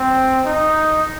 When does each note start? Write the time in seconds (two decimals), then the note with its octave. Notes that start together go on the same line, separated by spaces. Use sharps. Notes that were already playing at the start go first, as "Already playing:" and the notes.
Already playing: C4
0.45 D#4